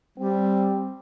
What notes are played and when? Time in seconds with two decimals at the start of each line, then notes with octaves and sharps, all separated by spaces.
0.18 G3 C4